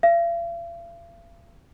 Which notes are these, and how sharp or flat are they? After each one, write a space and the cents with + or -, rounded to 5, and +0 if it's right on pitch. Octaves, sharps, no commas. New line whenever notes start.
F5 -45